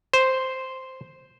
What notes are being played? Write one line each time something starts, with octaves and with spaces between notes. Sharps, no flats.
C5